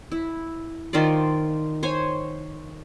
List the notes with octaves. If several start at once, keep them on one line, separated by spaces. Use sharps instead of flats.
E4
D#3 F4 C5 D5
C5 C#5 G#5